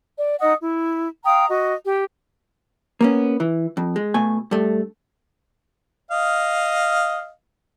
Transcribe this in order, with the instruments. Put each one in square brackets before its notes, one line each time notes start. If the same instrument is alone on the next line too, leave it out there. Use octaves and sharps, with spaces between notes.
[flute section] D5
D#4 D#5 F#5 D#6
E4
F5 G5 A#5 D#6
F#4 D#5
G4
[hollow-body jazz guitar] A#3 B3 C#4
E3
F2
G#3
B2 A3 G#5
G2 A3
[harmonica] D#5 F5